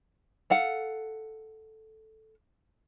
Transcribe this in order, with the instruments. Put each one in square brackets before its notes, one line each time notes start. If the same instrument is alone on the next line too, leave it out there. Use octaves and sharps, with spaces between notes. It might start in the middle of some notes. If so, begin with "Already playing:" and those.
[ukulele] A4 F5 F#5